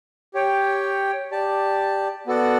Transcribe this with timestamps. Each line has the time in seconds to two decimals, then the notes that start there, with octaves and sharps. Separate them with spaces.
0.34 G4 C#5 G5
1.31 G4 D5 A5
2.27 B3 F#4 A4 D5 F#5